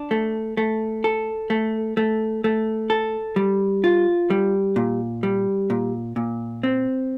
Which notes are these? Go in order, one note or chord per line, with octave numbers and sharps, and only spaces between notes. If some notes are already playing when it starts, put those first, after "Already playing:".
Already playing: D4
A3
A3
A4
A3
A3
A3
A4
G3
F4
G3
A#2
G3
A#2
A#2
C4